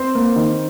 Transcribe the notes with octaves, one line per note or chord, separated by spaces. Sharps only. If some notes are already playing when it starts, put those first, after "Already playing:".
Already playing: C4 C5
A#3
D#3